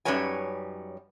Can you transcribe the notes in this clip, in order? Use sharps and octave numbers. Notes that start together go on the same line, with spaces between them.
F#2 G3 D#4 B4 C#5 G#5